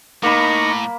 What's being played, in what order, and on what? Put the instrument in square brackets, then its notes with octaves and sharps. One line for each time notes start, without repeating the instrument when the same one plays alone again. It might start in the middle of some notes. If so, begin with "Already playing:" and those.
[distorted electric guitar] A2 [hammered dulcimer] A#3 B5 [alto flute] D#4 [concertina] A#5 C#6